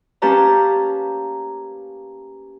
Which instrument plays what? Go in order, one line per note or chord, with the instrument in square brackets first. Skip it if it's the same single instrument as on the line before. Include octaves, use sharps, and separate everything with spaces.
[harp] A#3 C#4 G4 B4 A5 A#5